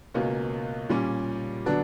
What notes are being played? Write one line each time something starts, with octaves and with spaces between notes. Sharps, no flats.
C#2 B2 A#3 C#4
A#2 G3 C#4
D3 F#3 B3 D4